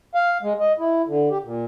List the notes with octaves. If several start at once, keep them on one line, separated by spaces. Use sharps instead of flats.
F5
G#3
D#5
E4
D3
G4
A#2